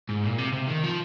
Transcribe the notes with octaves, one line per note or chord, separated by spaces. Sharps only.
G#2
A#2
C3
C3
D#3
F3